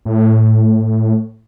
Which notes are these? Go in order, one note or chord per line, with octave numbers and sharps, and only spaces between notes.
A2